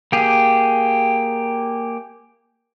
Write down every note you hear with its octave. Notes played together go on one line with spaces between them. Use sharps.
A#3 G4 G#4